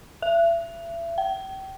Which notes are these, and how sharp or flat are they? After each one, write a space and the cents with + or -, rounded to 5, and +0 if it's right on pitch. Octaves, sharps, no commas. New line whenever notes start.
E5 +35
G5 -30